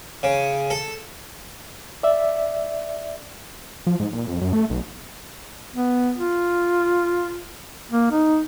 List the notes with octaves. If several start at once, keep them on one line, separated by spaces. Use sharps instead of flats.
C#3
A4
D5 E5
F3
G#2
A#2
F2
F#2
A3
B1
B3
F4
A#3
D#4